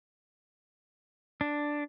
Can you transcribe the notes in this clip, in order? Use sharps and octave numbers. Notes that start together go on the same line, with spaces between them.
D4